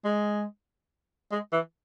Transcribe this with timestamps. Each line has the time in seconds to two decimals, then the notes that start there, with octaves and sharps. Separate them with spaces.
0.05 G#3
1.32 G#3
1.52 E3